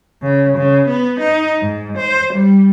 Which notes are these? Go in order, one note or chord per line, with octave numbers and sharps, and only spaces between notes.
C#3
C#3
B3
D#4
G#2
C5
G3